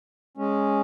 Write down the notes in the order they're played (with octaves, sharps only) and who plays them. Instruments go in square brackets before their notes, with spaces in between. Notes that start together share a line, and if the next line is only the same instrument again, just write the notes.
[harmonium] G#3 C#4